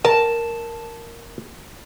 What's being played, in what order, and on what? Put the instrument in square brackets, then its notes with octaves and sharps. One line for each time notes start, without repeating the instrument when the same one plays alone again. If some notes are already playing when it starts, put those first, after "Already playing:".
[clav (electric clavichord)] A#4 [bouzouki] A5